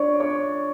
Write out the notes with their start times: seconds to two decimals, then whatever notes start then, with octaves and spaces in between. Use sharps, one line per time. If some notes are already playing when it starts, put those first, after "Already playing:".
Already playing: D4 C#5 D5 C#6
0.20 C#5 C#6